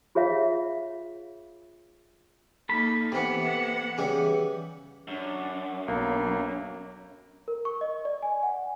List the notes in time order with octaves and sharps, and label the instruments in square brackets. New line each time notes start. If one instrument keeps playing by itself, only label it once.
[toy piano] F4 G#4 C#5 E5 F5
[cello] A#3 D#4 [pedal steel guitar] A4 B5
[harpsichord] C3 E3 [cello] B3 F#5
[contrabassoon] C#3 [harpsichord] E3 G3
[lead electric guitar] F#2 [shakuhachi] D4
[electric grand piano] B1 [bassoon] A#3 [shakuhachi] D4
[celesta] A#4
C#6
D#5
D5
G#5
F#5